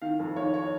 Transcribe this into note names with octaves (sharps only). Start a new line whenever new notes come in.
D#3 F5
F2
D#3 C#5
C#5